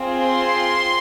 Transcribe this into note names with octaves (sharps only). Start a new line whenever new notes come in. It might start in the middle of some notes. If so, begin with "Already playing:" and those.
Already playing: C4 F4 G#4
C6